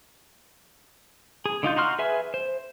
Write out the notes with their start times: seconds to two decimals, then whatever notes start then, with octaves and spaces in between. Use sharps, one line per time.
1.46 G#4
1.63 D3 D#4 F4 G6
1.76 D#4 F#4 C6 F6
1.99 G#4 B4 E5 G#5
2.34 C5